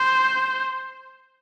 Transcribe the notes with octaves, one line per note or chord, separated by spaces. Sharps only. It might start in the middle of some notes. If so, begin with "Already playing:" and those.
Already playing: C5